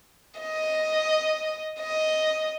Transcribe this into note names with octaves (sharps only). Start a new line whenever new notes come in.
D#5
D#5